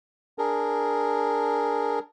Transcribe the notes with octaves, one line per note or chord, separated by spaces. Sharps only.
D4 G#4 A#4